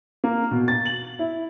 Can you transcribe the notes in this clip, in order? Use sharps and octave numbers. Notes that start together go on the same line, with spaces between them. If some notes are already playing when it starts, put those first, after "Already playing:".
A#3
B2
A6
F#7
E4